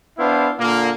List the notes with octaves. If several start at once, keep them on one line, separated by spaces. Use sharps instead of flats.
B3 D4 E4 C5 F5
A#2 D3 A#3